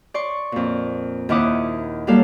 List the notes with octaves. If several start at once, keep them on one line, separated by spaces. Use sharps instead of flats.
D5 C6 C#6
F2 A#2
D#2 D#3 E4 F#5 D6 D#6
F#3 G3 A#3 A4 F5